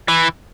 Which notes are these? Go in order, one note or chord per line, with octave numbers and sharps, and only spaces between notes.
E3